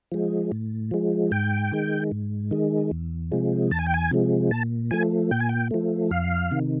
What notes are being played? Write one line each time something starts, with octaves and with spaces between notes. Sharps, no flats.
F3 G#3
A2
F3 G#3
G#2 G5
D#3 G#3
G#2
D#3 G#3
E2
C3 F3 G#3
E2 A5
G#5
G5
G#5
C3 F3 G#3
A#2 A5
F3 A3 G#5
A#2 G5
G#5
G5
F3 A3
F2 F5
C3 D#3